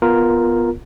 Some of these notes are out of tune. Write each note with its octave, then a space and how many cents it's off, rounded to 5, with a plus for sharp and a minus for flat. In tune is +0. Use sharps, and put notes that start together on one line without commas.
B3 -5 F4 +0 A#4 +0